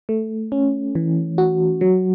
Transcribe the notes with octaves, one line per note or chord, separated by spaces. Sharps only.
A3
C#4
E3
F#4
F#3